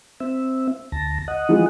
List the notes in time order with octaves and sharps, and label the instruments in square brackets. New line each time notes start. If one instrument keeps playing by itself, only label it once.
[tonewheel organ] C4 E5
D2 A5 A#6
D#5 F#5
[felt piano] E3 F3 G#3